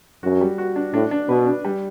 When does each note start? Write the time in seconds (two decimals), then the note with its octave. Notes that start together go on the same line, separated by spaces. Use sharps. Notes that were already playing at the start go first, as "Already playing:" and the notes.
0.23 F#2 F#4
0.41 G3
0.58 F#4
0.76 D4
0.94 A2 D4
1.11 D4
1.29 B2 B4
1.46 D4
1.65 G3